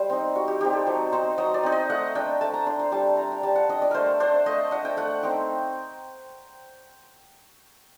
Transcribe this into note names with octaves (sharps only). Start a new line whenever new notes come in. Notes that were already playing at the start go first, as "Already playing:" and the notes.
Already playing: G3 C5
C4 D#4
G3 F#4
G4
C4 D#4 G4
A4
F#3 C5
C4 D#4 C5
F#3 D#5
D5
C4 D#4
D#5
A3 F#5
D4 G5
A3 A5
A#5
D4 C6
C6
G3 A5
D4 A#5
G5
G3 A5
F#5
D4 D#5
D5
A3 A#4 C5
D4 C5
A3 D#5
D4 F#5
G5
A3 F#5
C4 D#4 G5